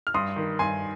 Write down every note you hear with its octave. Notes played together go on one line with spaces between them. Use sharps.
F6
G2 C6 D#6
D#3
G2 G#5 C6